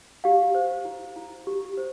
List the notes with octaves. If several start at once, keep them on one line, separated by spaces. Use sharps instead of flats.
G4 F5
C5
E4
E4
G4
C5